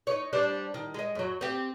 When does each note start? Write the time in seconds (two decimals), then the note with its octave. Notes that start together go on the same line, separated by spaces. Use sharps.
0.07 D#4 C#5
0.33 G3 D4 C5
0.74 D#3
0.94 G#3 D#5
1.15 F#2 F#3
1.41 C4 G4